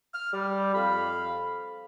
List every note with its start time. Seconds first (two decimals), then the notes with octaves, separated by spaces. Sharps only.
0.13 F6
0.33 G3
0.75 F2 F5 B5